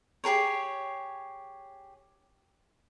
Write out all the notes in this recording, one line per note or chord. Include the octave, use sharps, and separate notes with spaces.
G4 G#4 A#4 C#5